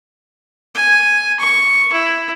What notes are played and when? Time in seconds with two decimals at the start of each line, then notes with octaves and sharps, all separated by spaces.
0.75 G#5
1.39 C#6
1.93 E4